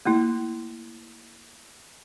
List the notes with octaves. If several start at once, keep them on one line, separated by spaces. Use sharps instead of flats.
A3 A#3 E4